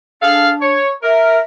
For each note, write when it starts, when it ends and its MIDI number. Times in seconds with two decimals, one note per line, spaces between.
0.22 0.72 62
0.22 0.50 68
0.22 0.50 69
0.22 0.50 77
0.61 0.90 73
1.03 1.38 70
1.03 1.38 76